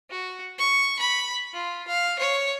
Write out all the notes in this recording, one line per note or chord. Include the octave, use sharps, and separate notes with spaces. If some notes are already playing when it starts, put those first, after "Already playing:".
F#4
C#6
B5
F4
F5
C#5